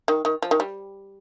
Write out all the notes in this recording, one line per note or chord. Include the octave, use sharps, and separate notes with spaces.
D#3
D#3
F3
D#3
G3